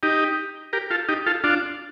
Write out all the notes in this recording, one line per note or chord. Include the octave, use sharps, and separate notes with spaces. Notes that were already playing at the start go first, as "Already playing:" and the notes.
D#4 G4
G4 A#4
F4 A4
D#4 G4
F4 A4
D4 F4